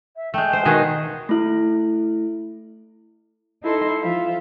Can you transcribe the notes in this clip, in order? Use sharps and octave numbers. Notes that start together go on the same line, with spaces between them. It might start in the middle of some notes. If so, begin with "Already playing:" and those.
E5
G#3 A3 G5
C5
B2 D#3 F#4 G#4
A3 E4
D#4 E4 A4 C6
F3 F4 E5